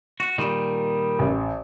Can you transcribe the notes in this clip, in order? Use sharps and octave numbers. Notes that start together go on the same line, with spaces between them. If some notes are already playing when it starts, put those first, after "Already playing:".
F#4
A#2 D#3 G3
A1